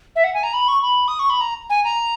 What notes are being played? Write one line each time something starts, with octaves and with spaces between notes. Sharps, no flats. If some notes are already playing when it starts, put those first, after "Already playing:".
E5
F#5
G#5
A#5
B5
C#6
B5
D#6
C#6
B5
A#5
G#5
A#5